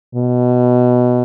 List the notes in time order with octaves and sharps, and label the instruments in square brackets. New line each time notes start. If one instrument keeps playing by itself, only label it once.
[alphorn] B2